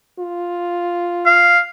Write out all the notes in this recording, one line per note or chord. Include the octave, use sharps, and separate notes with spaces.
F4
F5